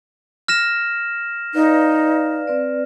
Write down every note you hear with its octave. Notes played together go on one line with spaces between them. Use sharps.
F6 A#6 E7
D#4 B4 D5 F5
C4 B4 D5